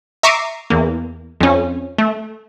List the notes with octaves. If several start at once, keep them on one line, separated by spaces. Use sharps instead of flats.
E5 A#5 C#6 D6 C7 D#7
E2 A#3
F2 C#4
A3